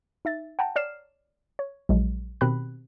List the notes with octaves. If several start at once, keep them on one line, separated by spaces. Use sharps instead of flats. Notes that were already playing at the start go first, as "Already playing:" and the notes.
D#4 E5 A6
F#5 G5 A5 A#5
C#5 D5 F6 C7 E7
C#5
A#1 F#3 G#3
B2 D#3 C4 G4 B5 F#6